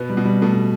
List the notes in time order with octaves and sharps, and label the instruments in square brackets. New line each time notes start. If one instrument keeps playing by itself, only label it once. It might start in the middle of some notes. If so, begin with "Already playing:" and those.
Already playing: [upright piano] B2 [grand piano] B3
[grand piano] G3
[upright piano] B2
[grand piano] G3
[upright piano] B2 [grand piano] A3